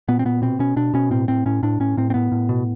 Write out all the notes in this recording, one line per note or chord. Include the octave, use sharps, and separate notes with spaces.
A#2 B3
C4
A#2 B3
B2 C4
B2 C#4
B2 D4
B2 C#4
A2 C4
A2 C4
A2 C#4
A2 D4
A2 C#4
A2 C4
C4
A2 B3
A2
B2